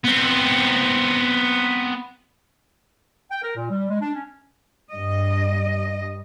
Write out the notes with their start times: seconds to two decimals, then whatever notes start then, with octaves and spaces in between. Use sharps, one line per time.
0.05 B3 C4
3.31 G5
3.43 A#4
3.56 A#2
3.70 G3
3.89 G#3
4.01 D4
4.14 C#4
4.93 G2 D#5